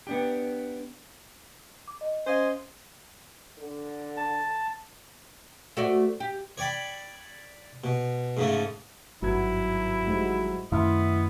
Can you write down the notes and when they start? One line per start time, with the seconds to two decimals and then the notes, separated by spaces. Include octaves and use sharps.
0.07 B3 D4 G4
1.88 D6
2.01 D#5
2.27 C#4 C5 D#5 F5 G#5 C6
3.58 D3
4.17 A5
5.77 A3 F#4 D5
6.20 G4
6.58 C#5 D5 G5 B5
7.84 B2
8.37 G#2 C#3 A3
9.22 G#1 G2 F#3 E4 G#6
10.06 G#2 G3 G#3
10.72 F#2 D#3 A3 B3 E4 F5 C6 F6